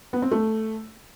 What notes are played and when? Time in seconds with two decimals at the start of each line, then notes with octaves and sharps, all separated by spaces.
0.13 B3
0.22 C4
0.31 A3